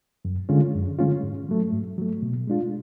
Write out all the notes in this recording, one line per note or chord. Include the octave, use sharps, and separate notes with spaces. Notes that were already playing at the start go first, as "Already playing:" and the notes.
F#2
D3 G#3 C#4 F4
F#2
D3 G#3 C#4 F4
G#2
F#3 A3
G#2
F#3 A3
B2
G#3 D4 F4